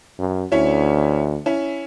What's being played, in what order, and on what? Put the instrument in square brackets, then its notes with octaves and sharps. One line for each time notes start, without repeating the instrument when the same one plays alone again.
[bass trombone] F#2
[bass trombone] D2 [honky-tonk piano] C#4 E4 C#5
[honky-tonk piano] C#4 E4